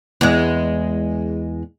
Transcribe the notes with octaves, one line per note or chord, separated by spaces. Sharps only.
E2 G#3